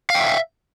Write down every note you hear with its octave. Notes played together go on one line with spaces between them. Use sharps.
E5 F5 G5